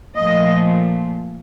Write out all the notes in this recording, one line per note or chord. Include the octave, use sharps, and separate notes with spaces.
A#2 F3 A3 D#5